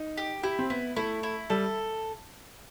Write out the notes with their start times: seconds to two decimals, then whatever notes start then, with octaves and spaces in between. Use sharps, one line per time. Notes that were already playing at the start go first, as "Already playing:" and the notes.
Already playing: D#4
0.17 G4
0.43 E4 G4
0.59 C4
0.70 B3 E4
0.96 A3 E4
1.23 E4
1.50 G3 A4